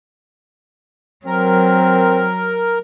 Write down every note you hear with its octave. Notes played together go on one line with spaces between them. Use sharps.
F#3 C4 A#4